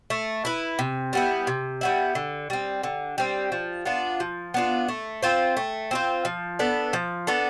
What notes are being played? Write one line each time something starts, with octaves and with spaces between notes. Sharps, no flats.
A3
E4 B4
C3
G3 B3 E4
C3
G3 B3 E4
D3
G3 C4
D3
G3 C4
F3
B3 D4 F4
F3
B3 D4 F4
A3
C4 F4 C5
A3
C4 F4 C5
F3
B3 D4 A4
F3
B3 D4 A4